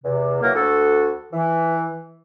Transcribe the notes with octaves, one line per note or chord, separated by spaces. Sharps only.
E2 C3
E3 F#3 A#3 A#4
D2 F#4 A4
E3